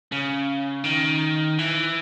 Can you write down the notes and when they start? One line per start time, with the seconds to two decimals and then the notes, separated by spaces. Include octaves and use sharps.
0.12 C#3
0.85 D#3
1.59 E3